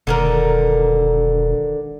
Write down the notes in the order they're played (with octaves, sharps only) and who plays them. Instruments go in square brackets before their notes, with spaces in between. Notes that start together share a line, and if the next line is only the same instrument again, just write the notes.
[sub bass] E1 [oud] D3 D#3 A#4